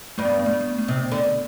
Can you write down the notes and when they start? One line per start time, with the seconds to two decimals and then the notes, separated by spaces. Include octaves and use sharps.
0.18 G2 A3
0.25 B3
0.32 A3
0.39 B3
0.46 A3
0.53 B3
0.61 A3
0.78 A3
0.88 C3 B3
1.12 D3